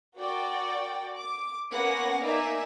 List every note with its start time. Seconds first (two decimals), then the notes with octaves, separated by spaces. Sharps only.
0.17 F#4 A#4 D5 G5
1.14 D6
1.72 A#3 B3 C#4 F#5 G#5 A#6
2.21 A#3 D#4 D5 E5 G#5